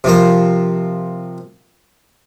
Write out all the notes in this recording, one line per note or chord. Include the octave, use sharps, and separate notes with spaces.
C3 F3 A#4